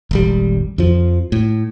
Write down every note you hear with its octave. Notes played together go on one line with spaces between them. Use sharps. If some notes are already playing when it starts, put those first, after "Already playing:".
D#1 G#1 G3
F2 F3
A2